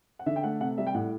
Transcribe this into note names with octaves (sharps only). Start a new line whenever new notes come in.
F#5
D3 E5
G5
A3 F#5
C3 F#5
G3 E5
G5
A2 F#5